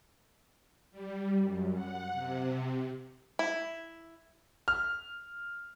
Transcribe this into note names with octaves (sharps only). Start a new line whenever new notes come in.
G3
F#2
F#5
C3
E4
F6